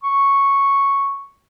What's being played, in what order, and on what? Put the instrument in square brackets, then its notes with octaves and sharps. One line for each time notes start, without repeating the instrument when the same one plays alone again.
[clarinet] C#6